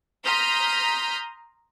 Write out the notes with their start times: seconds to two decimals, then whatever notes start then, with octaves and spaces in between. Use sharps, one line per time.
0.24 A#5 C6 D#6 F6 G6 B6